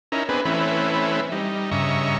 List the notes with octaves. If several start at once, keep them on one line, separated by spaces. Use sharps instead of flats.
C#4 D#4 E4 A#4
B3 C4 D4 G#4 B4
E3 A3 C4 C#4 E4 B4
G3 D#4
G2 C#3 D#5 E5 A#5 C#6